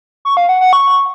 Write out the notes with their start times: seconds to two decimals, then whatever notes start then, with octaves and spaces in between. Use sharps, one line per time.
0.25 C#6
0.37 F5
0.49 F#5
0.61 F#5
0.73 C#6